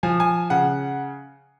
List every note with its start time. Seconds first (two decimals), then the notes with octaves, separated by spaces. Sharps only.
0.03 F3 G#5
0.20 G#5
0.50 C#3 F#5